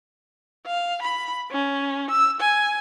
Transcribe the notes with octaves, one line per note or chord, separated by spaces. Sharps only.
F5
B5
C#4
E6
G#5